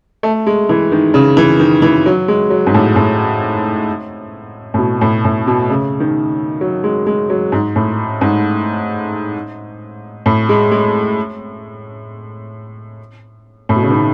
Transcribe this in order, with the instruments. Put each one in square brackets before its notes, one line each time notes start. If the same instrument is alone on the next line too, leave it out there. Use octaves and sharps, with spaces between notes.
[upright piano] A3
G#3
E3
D#3
C#3
E3
D#3
E3
F#3
G#3
F#3
G#2
A2
A2
A2
B2
A2
A2
B2
C#3
D#3
F#3
G#3
G#3
F#3
G#2
A2
G#2
A2
G#3
G#3
A2
B2
C#3
D#3